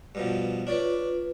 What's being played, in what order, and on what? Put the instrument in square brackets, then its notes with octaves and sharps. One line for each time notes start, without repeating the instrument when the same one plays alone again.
[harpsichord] G2 B2 F3
[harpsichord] D4 C#5 D5 [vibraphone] F4 B4